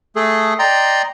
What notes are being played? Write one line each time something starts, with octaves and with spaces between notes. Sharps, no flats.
A3 G#4 A4
D5 D#5 G5 A#5 C6